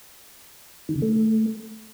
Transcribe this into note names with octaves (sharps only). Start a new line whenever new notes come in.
D#3
C#3
A3